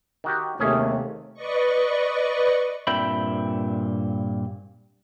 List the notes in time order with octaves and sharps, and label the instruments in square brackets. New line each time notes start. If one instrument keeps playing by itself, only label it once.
[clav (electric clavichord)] D#3 F#4 G4
[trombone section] D#2 C3 A3 [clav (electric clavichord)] C#4 G#4
[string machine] B4 D5 D#5 C#6
[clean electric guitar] G2 A#2 C4 E5 G5 B5